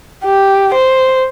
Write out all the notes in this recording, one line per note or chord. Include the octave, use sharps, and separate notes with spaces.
G4
C5